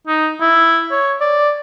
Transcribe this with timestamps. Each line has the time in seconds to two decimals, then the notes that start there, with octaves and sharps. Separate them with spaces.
0.07 D#4
0.41 E4
0.92 C#5
1.21 D5